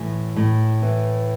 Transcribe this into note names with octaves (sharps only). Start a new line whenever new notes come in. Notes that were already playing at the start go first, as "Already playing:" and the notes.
Already playing: A2 E3
A2
E3